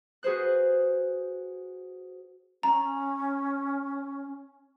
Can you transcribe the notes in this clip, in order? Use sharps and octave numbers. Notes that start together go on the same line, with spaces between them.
F#4 G#4 B4 C5 F#6
C#4 A#5